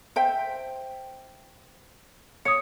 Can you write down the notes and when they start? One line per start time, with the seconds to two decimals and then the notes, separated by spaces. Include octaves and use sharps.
0.16 C5 E5 G5
2.45 C#5 D#6 C#7